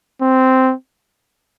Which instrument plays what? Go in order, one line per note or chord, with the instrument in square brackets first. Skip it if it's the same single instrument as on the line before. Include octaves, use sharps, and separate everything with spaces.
[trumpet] C4